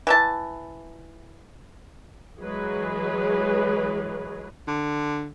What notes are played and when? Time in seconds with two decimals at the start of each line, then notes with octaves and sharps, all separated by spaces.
0.07 E3 E5 A5
2.39 E3 F#3 G#3 G#4 B4
4.67 D3